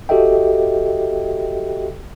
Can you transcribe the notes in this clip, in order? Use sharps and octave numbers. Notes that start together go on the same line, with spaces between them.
F#4 G4 A4 D#5 E5 G5